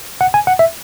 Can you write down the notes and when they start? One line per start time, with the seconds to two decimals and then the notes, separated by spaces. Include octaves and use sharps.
0.21 F#5
0.34 G#5
0.47 F#5
0.59 E5